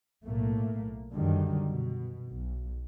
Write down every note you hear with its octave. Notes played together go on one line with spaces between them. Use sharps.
B1 A2 A3 A#3
F#2 D3 D#3 F#3 G3
B2
B1